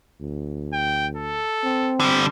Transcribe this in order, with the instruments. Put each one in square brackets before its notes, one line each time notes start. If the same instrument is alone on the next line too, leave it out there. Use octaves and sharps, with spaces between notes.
[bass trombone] D2
[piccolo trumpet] G5
A4
[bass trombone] C4
[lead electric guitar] D3 G3